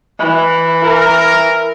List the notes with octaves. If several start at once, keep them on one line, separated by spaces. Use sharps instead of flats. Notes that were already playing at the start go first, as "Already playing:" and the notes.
E3
E4 A#4